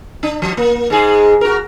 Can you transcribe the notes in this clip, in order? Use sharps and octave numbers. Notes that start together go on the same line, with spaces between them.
D4
F3
A#3
G#2 G#3 G#4
F#4 A#4